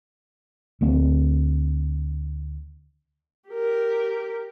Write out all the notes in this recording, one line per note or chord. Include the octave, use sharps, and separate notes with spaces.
D2 A3 C4
G4 A#4